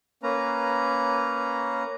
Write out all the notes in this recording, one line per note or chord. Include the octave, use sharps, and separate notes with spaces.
A#3 C#4 B4 A#5